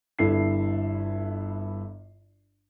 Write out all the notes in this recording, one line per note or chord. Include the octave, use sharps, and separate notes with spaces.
G1 G2 E4 A4 E5 C7